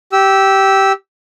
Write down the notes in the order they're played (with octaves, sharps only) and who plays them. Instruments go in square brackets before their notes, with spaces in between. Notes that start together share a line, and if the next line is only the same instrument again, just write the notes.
[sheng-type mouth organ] G4 E6